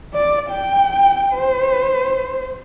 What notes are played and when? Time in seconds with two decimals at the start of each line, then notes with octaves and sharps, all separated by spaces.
0.14 D5
0.50 G5
1.34 C5